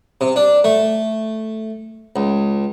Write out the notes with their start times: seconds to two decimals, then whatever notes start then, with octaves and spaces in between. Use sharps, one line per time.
0.21 C3
0.36 D4
0.64 A3
2.16 C#2